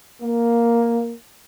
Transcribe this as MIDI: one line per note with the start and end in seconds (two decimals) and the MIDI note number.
0.22 1.12 58